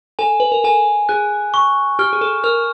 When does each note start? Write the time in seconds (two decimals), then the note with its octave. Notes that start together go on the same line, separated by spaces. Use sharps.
0.19 A4 G#5
0.40 B4
0.52 A#4
0.64 A4 G#5
1.09 G#4 F#6
1.54 C#6
1.99 G4 F6
2.13 G#4
2.21 A4
2.44 A#4 F6